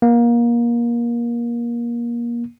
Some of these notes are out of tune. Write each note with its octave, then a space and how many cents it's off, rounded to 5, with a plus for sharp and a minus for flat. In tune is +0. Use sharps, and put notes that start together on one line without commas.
A#3 +25